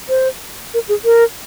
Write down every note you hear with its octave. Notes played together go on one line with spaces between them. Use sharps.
C5
A#4
G#4
A#4